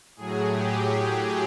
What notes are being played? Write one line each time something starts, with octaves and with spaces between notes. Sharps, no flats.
A2 F#3 G#4
G4